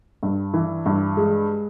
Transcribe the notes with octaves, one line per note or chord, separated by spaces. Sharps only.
G2
E3
G2
G#3